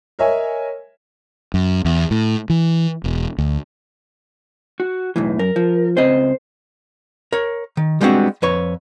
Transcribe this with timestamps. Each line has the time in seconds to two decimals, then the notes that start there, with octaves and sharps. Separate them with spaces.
0.19 A#4 C#5 D#5 E5 G#5
1.54 F#2
1.85 E2
2.11 A2
2.50 E3
3.04 E1
3.38 D2
4.80 F#4
5.16 B1 E2 A2 E3
5.39 F#2 A#4
5.56 F3
5.97 C#2 C4 C5 D#5
7.33 A#4 C#5
7.77 D#3
8.01 G3 G#3 B3 C4 D4 F#4
8.42 F2 B4 C#5